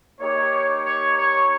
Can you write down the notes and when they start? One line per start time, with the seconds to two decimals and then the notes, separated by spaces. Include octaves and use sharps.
0.19 A#3 D#4 G4 C#5
0.84 C#5
1.15 C#5